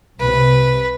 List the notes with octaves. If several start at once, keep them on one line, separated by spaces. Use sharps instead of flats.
C2 C3 B4